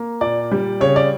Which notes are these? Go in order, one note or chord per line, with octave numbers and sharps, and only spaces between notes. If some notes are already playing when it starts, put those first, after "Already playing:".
Already playing: A#3
A#2 D5
G3
C#3 C#5
D5